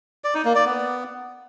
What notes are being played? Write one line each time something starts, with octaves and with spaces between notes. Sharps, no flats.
D5
D#4
A#3
D5
B3